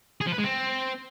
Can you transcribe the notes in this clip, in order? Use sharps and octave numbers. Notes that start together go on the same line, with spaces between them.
G#4
F3
B4
G#3
C4